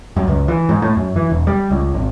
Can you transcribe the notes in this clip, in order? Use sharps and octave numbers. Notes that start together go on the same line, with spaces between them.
F#2
C#2
E3
G#2
A2
F#2
E3
E1
G3
C#2
G#1